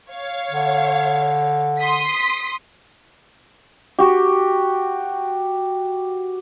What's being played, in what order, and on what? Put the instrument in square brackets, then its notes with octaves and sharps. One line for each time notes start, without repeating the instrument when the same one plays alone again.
[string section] C#5 F5
[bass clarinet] D3
[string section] C6 D#6 B6
[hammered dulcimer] F#4 G4